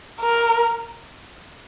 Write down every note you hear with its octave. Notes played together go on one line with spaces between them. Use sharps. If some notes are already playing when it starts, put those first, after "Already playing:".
A#4